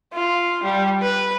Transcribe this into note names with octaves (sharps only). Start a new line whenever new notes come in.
F4
G3
B4